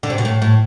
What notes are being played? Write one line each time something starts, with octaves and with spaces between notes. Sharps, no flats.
D3
C3
B2
A2
A2